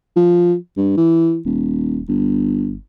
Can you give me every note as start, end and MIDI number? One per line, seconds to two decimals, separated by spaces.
0.16 0.55 53
0.77 0.97 43
0.97 1.38 52
1.45 2.00 27
2.08 2.76 31